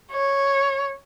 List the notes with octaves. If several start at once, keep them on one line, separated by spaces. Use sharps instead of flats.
C#5